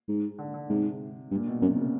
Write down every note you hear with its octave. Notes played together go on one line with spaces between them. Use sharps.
G#2
D3
D3
G#2 C3
G2
A#2
B2
F#2 C3
C#3